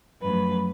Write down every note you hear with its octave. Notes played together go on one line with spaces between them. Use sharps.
F#2 F3 A3 B4